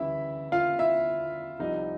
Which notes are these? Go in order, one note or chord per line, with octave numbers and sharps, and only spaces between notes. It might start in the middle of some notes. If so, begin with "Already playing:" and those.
Already playing: D2 C#3 E3 G3 E4 E5
F4 F5
E4 E5
C2 C3 F3 D#4 D#5